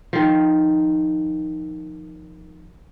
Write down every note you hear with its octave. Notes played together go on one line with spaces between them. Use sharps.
D#3 F3